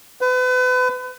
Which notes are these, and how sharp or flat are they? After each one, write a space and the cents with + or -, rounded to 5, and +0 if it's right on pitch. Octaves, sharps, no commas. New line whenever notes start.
B4 +35